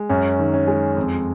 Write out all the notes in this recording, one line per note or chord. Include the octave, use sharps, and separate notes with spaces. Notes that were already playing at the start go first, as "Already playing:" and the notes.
Already playing: G#3
F#2 C#4
D#3
C#4
G#3
F2